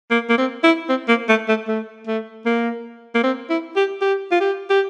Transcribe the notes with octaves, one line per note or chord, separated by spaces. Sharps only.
A#3
A#3
C4
E4
C4
A#3
A3
A3
A3
A3
A#3
A#3
C4
E4
G4
G4
F4
G4
G4